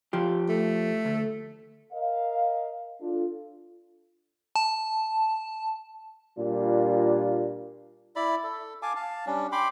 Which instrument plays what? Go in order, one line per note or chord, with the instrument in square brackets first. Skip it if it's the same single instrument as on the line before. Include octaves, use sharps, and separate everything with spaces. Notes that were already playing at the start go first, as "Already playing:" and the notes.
[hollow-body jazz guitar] F3 G4
[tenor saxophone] A3
[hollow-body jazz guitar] D2
[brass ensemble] A#4 D#5 F5
D4 F4 A4
[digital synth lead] A5
[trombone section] A#2 G3 A#3 D4 F4
[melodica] E4 D5 B5
A4
F5 G#5 A5 D6
F5 A5
G3 C#4 D4
G5 B5 C6 D6